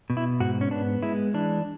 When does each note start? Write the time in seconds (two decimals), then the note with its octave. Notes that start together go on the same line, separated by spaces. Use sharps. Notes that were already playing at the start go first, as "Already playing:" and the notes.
0.10 B2
0.17 E4
0.40 G#2 F#4
0.61 C#4
0.71 B3 D4
1.03 G#3 E4
1.34 E3 D4